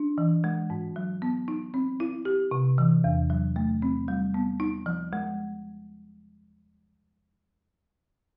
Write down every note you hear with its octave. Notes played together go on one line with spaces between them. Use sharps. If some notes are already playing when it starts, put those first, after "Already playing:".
Already playing: D4
E3
G#3
G#2
F#3
B3
D#4
C4
E4
G4
C3
E3
E2
F#3
A3
C4
G3
B3
D#4
F3
G#3